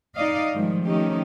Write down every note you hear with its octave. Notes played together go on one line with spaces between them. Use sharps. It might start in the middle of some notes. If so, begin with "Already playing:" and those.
D#4 D5 D#5 F5
G#2 D#3 F3 G3 G#3
D#3 F3 A3 C#4 D#4 G4